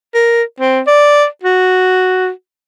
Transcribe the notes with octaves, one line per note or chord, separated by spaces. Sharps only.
A#4
C4
D5
F#4